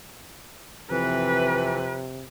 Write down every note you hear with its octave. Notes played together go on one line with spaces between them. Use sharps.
F2 C3 E3 B4